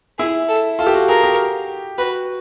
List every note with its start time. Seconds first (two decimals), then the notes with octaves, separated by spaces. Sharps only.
0.18 E4 G#4
0.49 A4
0.78 F4 A4
0.87 G4
0.94 F#4
1.08 G#4 A#4
1.24 G4
1.98 F#4 B4